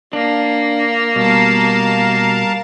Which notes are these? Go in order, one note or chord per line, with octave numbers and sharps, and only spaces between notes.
A#3 D4
B2 G3 A#4 F5 A5